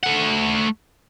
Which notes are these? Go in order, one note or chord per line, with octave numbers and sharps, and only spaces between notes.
A3 F#5